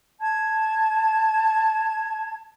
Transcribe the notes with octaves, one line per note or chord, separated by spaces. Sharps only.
A5 G#6